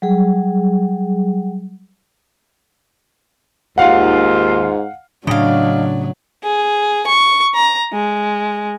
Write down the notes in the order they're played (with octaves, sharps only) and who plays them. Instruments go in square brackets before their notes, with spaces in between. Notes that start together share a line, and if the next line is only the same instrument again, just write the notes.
[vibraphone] F#3 G3 G#4
[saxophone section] D#2 F4 [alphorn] G#2 [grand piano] F5 F#5
[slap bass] A2 C#3 [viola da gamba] F#3 [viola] D4 [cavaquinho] D#5 F5
[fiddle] G#4
C#6
A#5
G#3